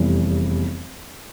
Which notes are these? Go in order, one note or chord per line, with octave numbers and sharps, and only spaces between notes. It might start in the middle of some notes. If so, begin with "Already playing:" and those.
Already playing: F1 E2 E3 G3